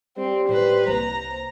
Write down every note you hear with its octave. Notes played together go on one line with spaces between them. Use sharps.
G3 C4
A2 B4 C5
C2 A#3 C5 A#5